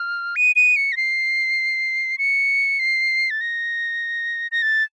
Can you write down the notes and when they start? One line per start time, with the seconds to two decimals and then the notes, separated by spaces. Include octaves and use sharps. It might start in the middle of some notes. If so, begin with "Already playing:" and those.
Already playing: F6
0.36 D#7
0.56 D#7
0.76 C#7
0.92 A#6
0.97 C7
2.18 C#7
2.79 C7
3.30 A6
3.41 A#6
4.52 A#6
4.62 A6